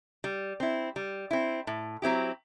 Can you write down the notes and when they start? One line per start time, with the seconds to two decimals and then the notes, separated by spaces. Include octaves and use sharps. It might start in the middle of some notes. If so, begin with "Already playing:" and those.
0.24 G3
0.60 C4 E4
0.96 G3
1.31 C4 E4
1.67 A2
2.02 F#3 C4 E4 G4